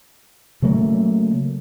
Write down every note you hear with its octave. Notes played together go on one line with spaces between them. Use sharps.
C#3 F#3 A3 A#3